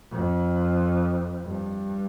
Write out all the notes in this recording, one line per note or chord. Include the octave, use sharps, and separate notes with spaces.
F2
G2